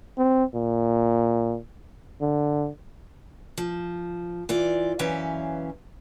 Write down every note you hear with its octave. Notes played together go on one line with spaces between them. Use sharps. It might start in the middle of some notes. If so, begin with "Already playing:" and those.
C4
A#2
D3
F3
E3 F4 D5
F#2 E3 C#4 E5 F5